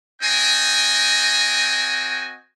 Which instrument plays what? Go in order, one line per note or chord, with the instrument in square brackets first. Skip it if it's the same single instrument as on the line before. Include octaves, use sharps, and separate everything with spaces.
[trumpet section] C4 F#4 D#5 G5 G#5